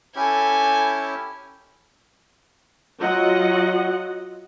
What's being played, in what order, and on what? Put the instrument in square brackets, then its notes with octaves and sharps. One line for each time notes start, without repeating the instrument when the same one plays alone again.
[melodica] C#4 E4 G4 [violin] A4 G#5
[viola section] F#3 F4 D#5 F#5